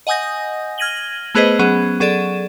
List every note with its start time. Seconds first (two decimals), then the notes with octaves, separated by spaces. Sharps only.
0.07 D#5 F#5 G#5 D#6 G6 A#6
0.78 F6 G#6 A#6 D#7 F#7 G7
1.35 A3 B3 G#4 B4 C5 D#5
1.59 F#3 B3 C#4 G#4
2.00 F#3 G#4 A4 D5 E7